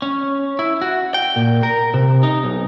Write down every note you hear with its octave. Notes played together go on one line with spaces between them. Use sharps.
C#4
E4
F#4
G5
A#2
A#4
C3
D#4
B1